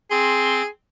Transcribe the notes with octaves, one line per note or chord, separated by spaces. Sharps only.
C4 G#4 C6